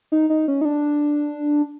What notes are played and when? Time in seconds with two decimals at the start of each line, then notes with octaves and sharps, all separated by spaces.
0.12 D#4
0.30 D#4
0.48 C#4
0.61 D#4
0.65 D4